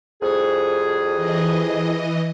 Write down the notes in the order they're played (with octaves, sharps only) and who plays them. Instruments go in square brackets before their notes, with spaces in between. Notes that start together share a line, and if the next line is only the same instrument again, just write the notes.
[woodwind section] C2 F2 G#4
[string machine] E3 D#5